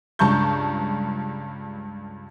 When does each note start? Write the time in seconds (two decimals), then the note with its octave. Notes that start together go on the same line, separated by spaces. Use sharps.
0.19 C#2 G2 A5 A#5 C#6 G6